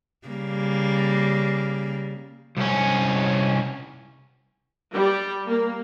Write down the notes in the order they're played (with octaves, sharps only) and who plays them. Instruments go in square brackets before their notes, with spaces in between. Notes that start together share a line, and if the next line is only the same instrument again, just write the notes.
[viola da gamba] C#3 G3 A#3
[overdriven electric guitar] C2 C#4
[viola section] G3
A#3